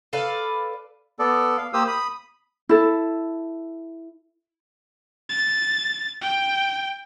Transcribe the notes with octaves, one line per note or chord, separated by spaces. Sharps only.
A4 B4 D5 F5
B3 A4 D5
F5
A#3 G4 C5 D#6 E6
B5 D#6
E4 A4
A6
G5